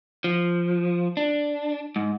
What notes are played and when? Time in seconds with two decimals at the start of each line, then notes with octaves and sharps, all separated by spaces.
0.24 F3
1.17 D4
1.96 G#2